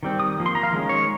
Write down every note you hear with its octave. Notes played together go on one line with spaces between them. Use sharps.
D#3 G3 C4
D#6
F3 A#3
C6
A#5
F5
D#3 G#3 C#4
C#5